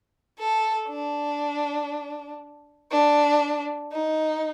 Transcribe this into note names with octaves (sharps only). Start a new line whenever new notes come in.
A4
D4
D4
D#4